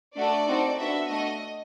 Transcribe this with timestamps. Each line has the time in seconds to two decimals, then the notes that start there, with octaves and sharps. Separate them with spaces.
0.15 A3 D4 F#4 A4 D5
0.47 C4 D#4 F#4 A4
0.78 B3 D4 F#4 A4 E5
1.09 A3 D4 F#4 A4 D#5